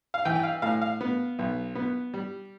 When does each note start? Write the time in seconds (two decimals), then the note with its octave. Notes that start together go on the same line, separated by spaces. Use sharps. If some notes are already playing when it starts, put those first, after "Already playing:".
0.14 F5
0.25 E3 G5
0.35 G5
0.43 F5
0.62 A2 F5
0.82 F5
1.01 B3
1.39 B1
1.75 B3
2.14 G3